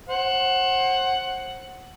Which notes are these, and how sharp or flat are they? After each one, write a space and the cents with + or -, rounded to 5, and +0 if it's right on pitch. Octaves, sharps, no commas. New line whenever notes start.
C5 +35 F#5 +10